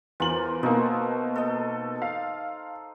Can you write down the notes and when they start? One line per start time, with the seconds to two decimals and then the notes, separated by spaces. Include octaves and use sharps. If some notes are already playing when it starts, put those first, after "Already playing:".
0.20 E2 F4 A#4 C5 F#7
0.63 B2 A#3 D#4 A4
1.36 A4 D#5
2.02 F5